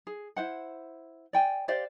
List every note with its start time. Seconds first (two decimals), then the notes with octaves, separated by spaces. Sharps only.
0.07 G#4
0.36 E4 C5 F#5
1.33 D5 G5 G#5
1.68 G4 C5 D5 F5